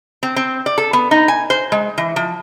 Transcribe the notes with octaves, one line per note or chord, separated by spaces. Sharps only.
C4
C4
D5
A4
B3
D#4
G#5
C5
G#3
E3
F3